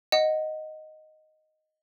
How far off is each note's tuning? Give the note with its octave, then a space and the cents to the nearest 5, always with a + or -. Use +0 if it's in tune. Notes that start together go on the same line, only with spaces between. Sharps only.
D#5 +0 F#5 +0